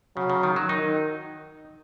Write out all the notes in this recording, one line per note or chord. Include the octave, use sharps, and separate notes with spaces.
C#3 F#3
C#3
D#3
F#3
D#3 D#4